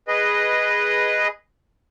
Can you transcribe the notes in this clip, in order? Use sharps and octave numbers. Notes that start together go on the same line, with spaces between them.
G#4 B4 D#5